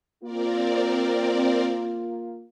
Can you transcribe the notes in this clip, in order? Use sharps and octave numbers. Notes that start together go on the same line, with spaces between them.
A#3 C4 F4 A#4 D5